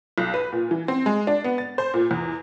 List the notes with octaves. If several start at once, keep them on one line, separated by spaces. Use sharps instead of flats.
B1
B4
A#2
E3
C4
G#3
D4
B3
A6
C5
A#2
E2